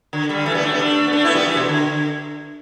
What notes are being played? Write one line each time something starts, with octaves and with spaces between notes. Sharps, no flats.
D3
D3 G3
E3 A3
G3 B3
A3 D4
G3 B3
A3 D4
B3
A3 D4
B3 E4
G3 B3
E3 A3
B2
D3